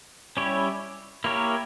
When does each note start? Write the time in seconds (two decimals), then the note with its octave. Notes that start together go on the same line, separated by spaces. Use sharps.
0.37 G3 C#4 E4 G4 C#5
1.24 A#3 E4 G4 A#4 C#5